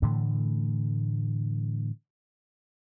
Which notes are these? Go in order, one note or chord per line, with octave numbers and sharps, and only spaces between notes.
A2 D3 E3 A3